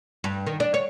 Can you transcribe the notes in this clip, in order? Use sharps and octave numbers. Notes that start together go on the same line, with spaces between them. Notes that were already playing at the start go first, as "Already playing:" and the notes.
G2
D#3
D4
C#5